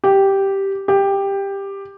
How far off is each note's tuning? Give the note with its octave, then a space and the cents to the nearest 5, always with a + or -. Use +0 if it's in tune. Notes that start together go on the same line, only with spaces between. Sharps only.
G4 -5
G4 +10